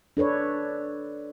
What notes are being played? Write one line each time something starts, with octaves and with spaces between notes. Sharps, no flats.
D4 A4 B4 C#5